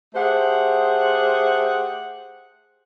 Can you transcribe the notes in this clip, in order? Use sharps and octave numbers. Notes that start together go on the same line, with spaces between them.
A3 G4 G#4 C5 F#5